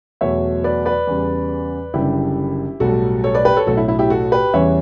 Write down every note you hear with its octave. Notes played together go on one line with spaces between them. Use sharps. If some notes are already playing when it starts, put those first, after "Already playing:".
E2 B2 F#3 A3 C#5 E5
B4 D5
B4 D5
E2 C#3 G3
F#1 F#2 D3 G3 E4 G4
B1 A2 G3 F#4 A4
A4 C#5
B4 D5
G4 B4
A4 C#5
B1 A2 F#3 F#4 A4
E4
E4
E4 G4
F#4 A4
G4 B4
E2 C#3 E3 G3 C#4 C#5 E5